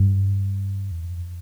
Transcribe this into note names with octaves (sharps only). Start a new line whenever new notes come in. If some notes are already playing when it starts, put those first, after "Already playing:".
Already playing: G2
E2
F2